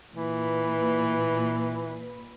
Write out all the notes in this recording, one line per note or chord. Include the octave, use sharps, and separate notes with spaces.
A#2 E3 B4